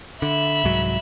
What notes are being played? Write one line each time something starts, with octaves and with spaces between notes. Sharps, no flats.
D3 E5 B5
C2 G#2 F#3